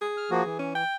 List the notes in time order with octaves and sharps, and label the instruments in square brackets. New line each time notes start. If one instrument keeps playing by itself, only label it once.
[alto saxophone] G#4
[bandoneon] F6
F3 A#3 F#4
E3
[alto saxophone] C#4
G5